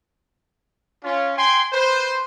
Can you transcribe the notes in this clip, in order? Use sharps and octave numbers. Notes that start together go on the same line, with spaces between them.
C#4 F4
G5 G#5 C6
B4 C5